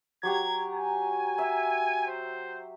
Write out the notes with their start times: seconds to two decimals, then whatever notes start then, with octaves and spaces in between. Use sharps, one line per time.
0.23 F#3 G4 A#5 G#6
0.74 G#5
1.38 E5
2.07 C5